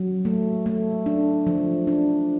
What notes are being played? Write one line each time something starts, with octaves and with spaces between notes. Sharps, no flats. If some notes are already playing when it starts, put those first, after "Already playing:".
Already playing: F#3
A3
A3
D4
F3
D4